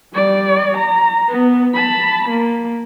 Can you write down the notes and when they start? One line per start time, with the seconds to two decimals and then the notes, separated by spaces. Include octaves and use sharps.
0.14 G3 D5
0.77 A#5
1.28 B3
1.74 A5 B5
2.29 A#3